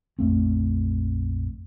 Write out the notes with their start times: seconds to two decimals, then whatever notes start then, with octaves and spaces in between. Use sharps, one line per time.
0.19 A#1 F2 A3 C4